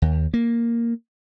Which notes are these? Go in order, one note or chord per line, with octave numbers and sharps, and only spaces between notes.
D#2
A#3